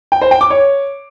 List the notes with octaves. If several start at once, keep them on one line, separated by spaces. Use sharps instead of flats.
G5
C5
G5
D6
C#5